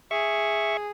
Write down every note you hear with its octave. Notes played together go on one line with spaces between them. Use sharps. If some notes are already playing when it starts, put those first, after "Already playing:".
G#4 E5 C#6